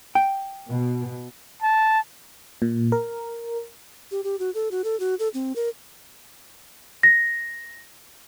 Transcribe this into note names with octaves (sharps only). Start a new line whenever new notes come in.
G5
B2
A5
A#2
A#4
G4
G4
F#4
A4
F#4
A4
F#4
A4
C4
A#4
A#6